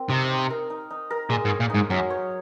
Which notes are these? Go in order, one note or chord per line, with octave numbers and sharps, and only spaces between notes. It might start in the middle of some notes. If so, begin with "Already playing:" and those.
Already playing: C4 A#4
C3 D#4
D#4
A#4
D#4
D#4
A#4
A#2 G#3
G#2
C#5
A#2
G#2 D#4
F#2 F#3
C#5